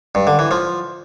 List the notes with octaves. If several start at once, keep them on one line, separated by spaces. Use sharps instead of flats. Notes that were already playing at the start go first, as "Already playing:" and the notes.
G2
D3
E3
F3